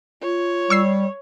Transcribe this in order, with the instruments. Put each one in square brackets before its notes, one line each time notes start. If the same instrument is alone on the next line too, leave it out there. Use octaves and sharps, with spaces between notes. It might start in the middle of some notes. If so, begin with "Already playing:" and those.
[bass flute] F4 [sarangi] C#5
[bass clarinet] G3 [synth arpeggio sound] C#6 E6 C7